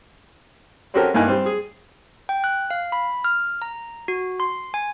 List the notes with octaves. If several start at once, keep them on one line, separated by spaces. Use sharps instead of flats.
C4 C#4 F#4 G4 A4 A#4
G2 A#3 D#4 E4 G#5 F#6
G3 C4
G#4
G5
F#6
F5
B5
F6
A#5
F#4
C6
G#5